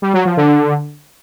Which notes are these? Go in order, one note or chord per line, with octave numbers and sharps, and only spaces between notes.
G3
F#3
F3
D3